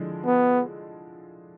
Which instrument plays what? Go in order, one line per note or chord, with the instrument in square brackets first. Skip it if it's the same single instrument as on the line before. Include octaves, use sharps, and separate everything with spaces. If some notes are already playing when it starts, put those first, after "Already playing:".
Already playing: [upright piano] D3 F3 G#3 E4
[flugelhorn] B3